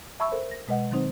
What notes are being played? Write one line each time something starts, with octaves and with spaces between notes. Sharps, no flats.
E5 A5 B5 C#6 E6
A4 A#4 C5
A#6
B2 G#3 B4 D#5 F#5
D#3 F#3 C4 D#4 C5